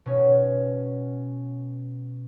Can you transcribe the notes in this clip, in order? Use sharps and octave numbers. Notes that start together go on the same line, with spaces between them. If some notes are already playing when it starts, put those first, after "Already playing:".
B2 C#4